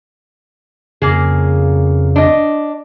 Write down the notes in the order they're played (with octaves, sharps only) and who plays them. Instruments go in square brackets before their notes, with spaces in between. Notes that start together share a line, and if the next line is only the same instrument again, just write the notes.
[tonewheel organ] F2 C#3 [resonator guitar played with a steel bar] A#3 G#4
[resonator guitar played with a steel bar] D4 D#5